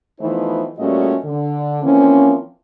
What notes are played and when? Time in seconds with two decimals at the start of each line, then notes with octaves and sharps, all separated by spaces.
0.20 E3 F3 A3 B3 D#4 C5
0.79 A#2 G3 A3 C#4 F#4 D#5
1.25 D3
1.83 E3 F3 A#3 C4 C#4